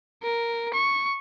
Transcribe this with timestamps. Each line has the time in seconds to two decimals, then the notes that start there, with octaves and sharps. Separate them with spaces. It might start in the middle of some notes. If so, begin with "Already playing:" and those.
0.23 A#4
0.74 C#6